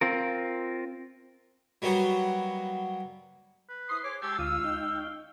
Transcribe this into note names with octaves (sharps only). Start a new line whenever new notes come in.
C4 F4 A#4
F#3 G3 A#3 B3 F#4
B4
E4 C5 C6 D#6
G#4 C5 C#5 D6
G#3 G4 G#5 A5 C6 C#6 E6
D2 F4 F5 D#6
D#4 G5